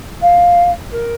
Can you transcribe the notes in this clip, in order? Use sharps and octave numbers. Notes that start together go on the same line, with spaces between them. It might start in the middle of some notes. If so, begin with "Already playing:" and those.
F5
A#4